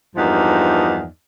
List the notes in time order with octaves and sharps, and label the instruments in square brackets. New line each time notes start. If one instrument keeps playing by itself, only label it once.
[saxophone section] E2 G2 F3 A#3 D#4